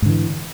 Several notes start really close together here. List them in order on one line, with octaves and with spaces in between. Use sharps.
G#2 D3 E3